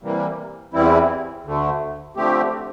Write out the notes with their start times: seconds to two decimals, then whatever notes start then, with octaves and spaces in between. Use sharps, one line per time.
0.02 C3 E3 G3 A#3
0.73 E2 E3 G3 C4 E4
1.45 D2 D3 A3
2.16 D3 F3 A3 C4 G4